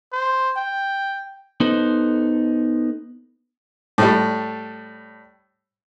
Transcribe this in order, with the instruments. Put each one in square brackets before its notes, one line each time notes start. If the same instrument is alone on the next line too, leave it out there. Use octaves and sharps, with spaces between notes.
[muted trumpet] C5
G5
[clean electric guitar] B3 D#4 A4 C5
[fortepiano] A2 G3